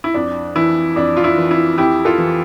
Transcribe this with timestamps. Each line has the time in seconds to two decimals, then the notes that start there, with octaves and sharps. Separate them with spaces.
0.04 E4
0.14 F2 D4
0.55 E3 E4
0.96 F2 D4
1.17 F4
1.24 E4
1.37 E3
1.51 E4
1.78 F2 E4 G4
2.05 F4 A4
2.18 E3